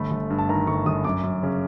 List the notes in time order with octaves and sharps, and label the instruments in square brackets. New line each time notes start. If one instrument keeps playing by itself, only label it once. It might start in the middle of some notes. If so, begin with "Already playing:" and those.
Already playing: [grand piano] G1 A3 B5
G1
G2
A5
D#3 A#5
G1 C#6
G1 D#6
F#2 D6
F#2
C#3